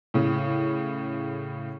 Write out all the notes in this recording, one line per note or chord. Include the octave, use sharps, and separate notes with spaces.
A2 C#3